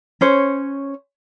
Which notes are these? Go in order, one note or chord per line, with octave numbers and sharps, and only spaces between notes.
C#4 C5 C#5